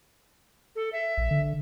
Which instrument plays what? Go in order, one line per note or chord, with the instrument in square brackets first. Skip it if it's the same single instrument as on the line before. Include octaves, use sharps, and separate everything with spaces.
[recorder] A4
E5
[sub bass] A#1
D3